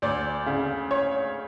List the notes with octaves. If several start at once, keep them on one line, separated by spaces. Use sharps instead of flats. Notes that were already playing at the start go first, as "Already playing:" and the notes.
D2 D5
C#3
C#5